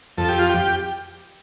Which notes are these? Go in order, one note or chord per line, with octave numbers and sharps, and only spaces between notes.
F2 A4
G4
F4
G4